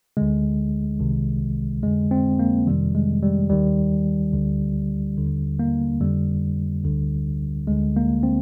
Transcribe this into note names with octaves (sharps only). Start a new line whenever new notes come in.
D2 D3 G#3
C2 C3 D#3
F2 D3 G#3
C4
A#3
F2 C3 D#3 G3
G#3
G3
D#2 D#3 G3
D2 D3
D#2 D3
A#3
F2 D3 G3
D2 D3
D2 D3 G#3
A#3
C4